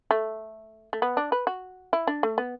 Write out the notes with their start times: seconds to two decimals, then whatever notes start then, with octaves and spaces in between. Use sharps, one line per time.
0.11 A3
0.93 A3
1.02 B3
1.17 D4
1.32 B4
1.47 F#4
1.93 E4
2.07 D4
2.23 A3
2.38 B3